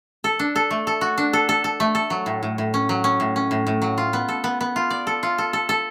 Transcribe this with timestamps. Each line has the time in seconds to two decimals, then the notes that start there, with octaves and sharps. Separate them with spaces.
0.24 A4
0.39 D4
0.56 A4
0.71 A3
0.87 A4
1.01 F#4
1.18 D4
1.33 A4
1.49 A4
1.64 A4
1.80 A3
1.95 A4
2.10 F#3
2.26 A2
2.43 A2
2.58 A2
2.74 C#4
2.89 F#3
3.04 C#4
3.20 A2
3.36 C#4
3.51 A2
3.67 A2
3.82 F#3
3.98 F4
4.13 B3
4.28 A4
4.44 B3
4.61 B3
4.76 F4
4.90 D5
5.07 A4
5.23 F4
5.38 A4
5.53 A4
5.69 A4